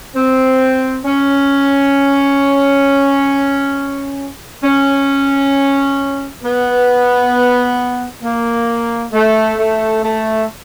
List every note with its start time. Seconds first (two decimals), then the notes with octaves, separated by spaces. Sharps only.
0.15 C4
1.05 C#4
4.64 C#4
6.43 B3
8.23 A#3
9.13 A3
9.58 A3
10.03 A3